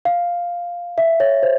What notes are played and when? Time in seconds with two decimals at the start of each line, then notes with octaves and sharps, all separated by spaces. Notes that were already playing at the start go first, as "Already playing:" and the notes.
0.05 F5
0.98 E5
1.20 C#5
1.43 C5